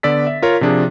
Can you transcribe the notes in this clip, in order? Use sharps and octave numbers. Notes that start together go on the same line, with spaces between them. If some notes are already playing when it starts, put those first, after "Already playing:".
D3 B3 D5 E6 A6 B6
E5
F4 A#4 C#5
C3 F3 D4 G#4